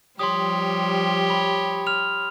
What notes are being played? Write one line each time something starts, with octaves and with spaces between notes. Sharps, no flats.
F3 G3 G4 C#5 C6 D#6
B5
F6 F7